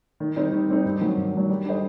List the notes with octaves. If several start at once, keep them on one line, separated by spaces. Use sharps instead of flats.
D#3
G3 C4 D#4
D#3
G3 C4 D#4
G2
D#3 F#3
G2
D#3 F#3
G3
D4 A4 C5 D#5